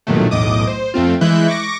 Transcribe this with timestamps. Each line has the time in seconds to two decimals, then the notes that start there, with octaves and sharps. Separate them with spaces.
0.07 B1 G2 A#2 D#3 F#3 A3
0.31 B1 E2 A2 D#5 D6 D#6
0.67 C5
0.94 F2 A3 C4 F4
1.21 E3 G#3 E4 E5 F#6 G6
1.48 C#6 D6 A#6